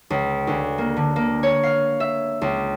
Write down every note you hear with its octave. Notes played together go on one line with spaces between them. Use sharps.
C#2
D2
A#3
D3
A#3
C#5
F5
E5
C#2